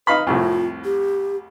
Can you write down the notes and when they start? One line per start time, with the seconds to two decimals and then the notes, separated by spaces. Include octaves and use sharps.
0.07 D#4 B4 F5 B5
0.27 C2 F2 A2 F4
0.84 G4